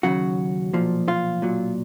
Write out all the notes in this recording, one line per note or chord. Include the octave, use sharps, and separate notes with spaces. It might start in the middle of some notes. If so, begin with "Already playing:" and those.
D#2 C#3 F#3 F#4
B1 A#2 F3
F4
B1 A#2 F#3